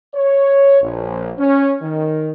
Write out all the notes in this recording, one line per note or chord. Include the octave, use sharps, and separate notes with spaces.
C#5
A#1
C#4
D#3